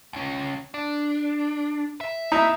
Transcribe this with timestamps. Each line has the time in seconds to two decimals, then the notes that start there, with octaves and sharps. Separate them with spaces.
0.13 C#2 C#4
0.74 D4
2.01 E5
2.32 D#4 E4